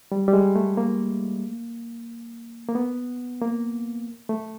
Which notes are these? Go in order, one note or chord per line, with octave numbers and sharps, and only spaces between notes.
G3
G3
G#3
A3
A#3
A#3
B3
A#3
A3